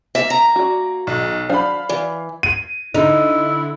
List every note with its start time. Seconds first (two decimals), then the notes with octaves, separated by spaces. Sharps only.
0.15 A#3 E5
0.30 A#5
0.56 F#4 D5
1.07 B1
1.49 F#3 D4 C5 F5 B5
1.89 E3 D5
2.43 D#7
2.95 D3 D#4 E4